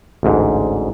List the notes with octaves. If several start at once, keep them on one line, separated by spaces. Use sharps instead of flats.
A1 D2 G#2